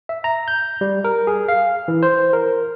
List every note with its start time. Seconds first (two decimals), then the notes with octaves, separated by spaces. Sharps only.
0.09 E5
0.24 A#5
0.48 G6
0.81 G3
1.04 A#4
1.27 G#4
1.48 F5
1.88 E3
2.03 C5
2.33 A#4